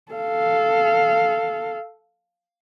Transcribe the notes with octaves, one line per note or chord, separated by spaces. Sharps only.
A4 F5